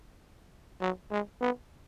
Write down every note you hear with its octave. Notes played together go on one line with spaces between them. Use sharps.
F#3
G#3
B3